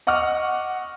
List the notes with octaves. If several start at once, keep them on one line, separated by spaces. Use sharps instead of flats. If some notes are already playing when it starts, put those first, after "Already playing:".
D#5 F#5 C#6 D6 F6